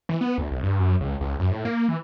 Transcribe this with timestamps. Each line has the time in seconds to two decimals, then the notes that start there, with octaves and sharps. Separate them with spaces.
0.09 E3
0.21 B3
0.38 D2
0.51 C2
0.63 G2
0.79 F#2
1.01 C#2
1.21 C#2
1.40 F#2
1.52 A2
1.65 A#3
1.89 E3